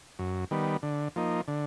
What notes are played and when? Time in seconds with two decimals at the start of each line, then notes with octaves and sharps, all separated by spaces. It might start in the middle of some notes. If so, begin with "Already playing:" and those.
0.19 F#2
0.51 D#3 G3 B3
0.83 D3
1.16 F3 A#3 D#4
1.48 D3